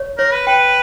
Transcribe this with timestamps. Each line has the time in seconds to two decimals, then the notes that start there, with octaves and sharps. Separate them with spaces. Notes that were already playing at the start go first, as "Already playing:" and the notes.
Already playing: C#5
0.18 A#4 C#5
0.33 B4
0.47 B4 G5